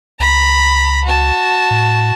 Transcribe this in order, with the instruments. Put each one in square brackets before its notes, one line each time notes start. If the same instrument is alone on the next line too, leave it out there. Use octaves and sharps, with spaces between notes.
[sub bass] C#2 [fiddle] A#5 B5
[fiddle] F#4 A5
[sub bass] A2